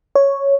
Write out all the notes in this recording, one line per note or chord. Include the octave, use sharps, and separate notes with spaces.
C#5